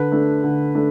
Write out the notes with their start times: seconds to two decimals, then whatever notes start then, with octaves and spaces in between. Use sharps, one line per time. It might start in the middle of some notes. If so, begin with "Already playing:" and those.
Already playing: D3 B4
0.12 A3 D4
0.44 D3
0.75 A3 D4